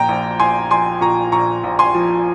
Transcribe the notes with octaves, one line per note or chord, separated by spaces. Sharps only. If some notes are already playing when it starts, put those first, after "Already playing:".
Already playing: A#2 F3 G5 A#5
A#1
A#1 G#5 C6
F3 G#5 C6
A#2 A#5 C#6
A#1 A#5 C#6
A#1
G#5 C6
F3